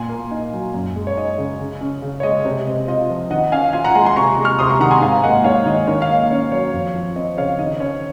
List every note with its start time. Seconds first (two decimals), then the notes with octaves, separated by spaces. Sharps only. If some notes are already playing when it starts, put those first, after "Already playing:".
Already playing: A#2 G#5 C6
0.09 A#3
0.31 D#4
0.53 F#3
0.74 F#2
0.96 G#3
1.07 C#5
1.17 D#4 D#5
1.38 C#3
1.59 C#3
1.81 C#4
2.02 C#3
2.20 C#5
2.23 G#3 D#5
2.45 C3
2.67 C4 D#5
2.88 F4 D#5
3.10 F3
3.30 D#3 D#5 F#5
3.52 C#4 F5 G#5
3.73 F4 F5 G#5
3.85 F#5 A#5
3.95 G#3 G#5 C6
4.05 G#5 C6
4.16 C3 A#5 C#6
4.38 G#3
4.44 C#6 F6
4.59 C3 C6 D#6
4.70 A#5 C#6
4.80 D#3 F#5 A#5
4.91 G#5 C6
4.98 A#5
5.01 G#2 F5 G#5
5.24 A#3 D#5 F#5
5.44 G#2 C#5 F5
5.66 D#3 D#5
5.87 D#3 C#5
6.02 F5
6.08 A#3 D#5
6.31 C#4 C#5
6.52 F#3 C#5
6.73 F2
6.94 F3
7.16 C4 D#5
7.38 C#3 C#5 F5
7.59 D#3 D#5
7.80 C#4 C#5